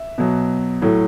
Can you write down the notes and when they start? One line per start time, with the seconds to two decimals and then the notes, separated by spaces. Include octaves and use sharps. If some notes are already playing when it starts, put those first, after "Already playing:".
Already playing: E5
0.18 B2 F#3
0.82 A2 F#3